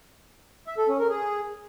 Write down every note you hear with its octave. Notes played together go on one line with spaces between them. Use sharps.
E5
A4
C#4
A#4
G#4